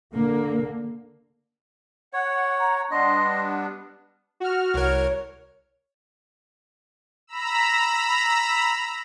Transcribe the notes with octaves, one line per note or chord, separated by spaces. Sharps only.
D3 A#3
C#5 F#5
A#5
G3 B3 D4 D#5 C6
F#4 F6
C2 A#4 C#5
A#5 B5 E6